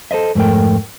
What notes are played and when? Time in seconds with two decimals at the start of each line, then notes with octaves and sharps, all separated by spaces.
0.11 A4 C5 D#5 E5
0.35 F2 G#2 A3 A#4 G5